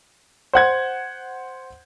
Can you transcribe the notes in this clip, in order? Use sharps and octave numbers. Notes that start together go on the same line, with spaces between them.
C5 F#5 G#6